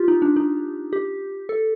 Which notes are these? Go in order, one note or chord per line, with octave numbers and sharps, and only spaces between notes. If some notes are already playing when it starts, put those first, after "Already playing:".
Already playing: F4 G4
D#4
D4
D#4
G4
A4